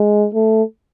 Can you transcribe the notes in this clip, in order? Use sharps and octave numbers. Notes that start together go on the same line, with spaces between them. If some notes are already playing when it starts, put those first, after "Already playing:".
Already playing: G#3
A3